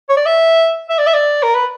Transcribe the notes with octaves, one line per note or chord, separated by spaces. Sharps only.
C#5
D5
E5
E5
D5
E5
D5
A#4
B4